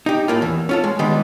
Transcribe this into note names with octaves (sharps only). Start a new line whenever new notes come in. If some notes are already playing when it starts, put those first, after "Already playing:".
D#4 G4
A2 A#3 F4
E2 E3
C#4 F4 A4
G#3
D#3 G3 G#3 B3 D4